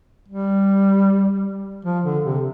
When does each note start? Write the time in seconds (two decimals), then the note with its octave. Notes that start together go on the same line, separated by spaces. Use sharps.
0.28 G3
1.85 F3
2.05 D3
2.24 C3